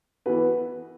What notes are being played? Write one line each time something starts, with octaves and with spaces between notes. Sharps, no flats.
E3 B3 F#4 B4